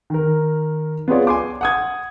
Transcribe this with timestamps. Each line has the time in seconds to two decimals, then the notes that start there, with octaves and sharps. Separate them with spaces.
0.10 D#3 A#4
1.08 B3 F4 G#4 C#5 D5
1.27 G#5 C6 D6
1.61 F#5 D#6 G#6